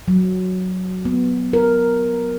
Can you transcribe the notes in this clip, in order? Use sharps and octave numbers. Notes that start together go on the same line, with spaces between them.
F#3
B3
A#4